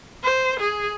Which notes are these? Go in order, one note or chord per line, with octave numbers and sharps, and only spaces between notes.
C5
G#4